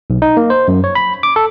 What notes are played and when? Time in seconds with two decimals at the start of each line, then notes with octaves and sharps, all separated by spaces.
0.10 B1
0.22 D#4
0.37 A#3
0.50 C5
0.68 F#2
0.84 C#5
0.95 B5
1.23 D6
1.36 A4